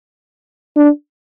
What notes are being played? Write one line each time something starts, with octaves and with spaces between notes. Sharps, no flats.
D4